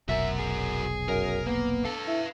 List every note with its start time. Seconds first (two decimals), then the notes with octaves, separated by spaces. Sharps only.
0.09 F1 B1 F#4 A#4 E5
0.39 G#4
1.08 F#2 A#4
1.46 A#3 B3
1.85 A4 B4 F5
2.07 E4